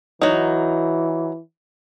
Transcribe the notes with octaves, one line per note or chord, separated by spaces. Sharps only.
E3 F#3 D#4